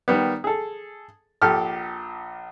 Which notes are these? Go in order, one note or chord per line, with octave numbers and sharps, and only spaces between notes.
D#3 G3 B3
G#4 A4
A#1 G4 A4 F6